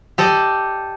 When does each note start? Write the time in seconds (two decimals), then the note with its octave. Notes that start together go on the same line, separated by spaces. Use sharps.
0.18 G4 A4 D5 D#5